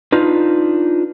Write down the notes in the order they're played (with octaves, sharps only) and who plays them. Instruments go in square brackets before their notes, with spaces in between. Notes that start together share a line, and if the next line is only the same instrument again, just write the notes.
[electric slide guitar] D4 D#4 F4 B4